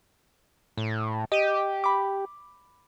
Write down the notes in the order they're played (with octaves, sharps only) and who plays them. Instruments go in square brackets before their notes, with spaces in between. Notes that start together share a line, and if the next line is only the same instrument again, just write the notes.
[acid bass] A2
[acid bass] G4 [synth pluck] D#5 D#7
[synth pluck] B5 D6